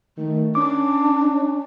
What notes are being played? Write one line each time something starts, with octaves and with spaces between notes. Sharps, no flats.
D#3 A3
C#4 D4 D6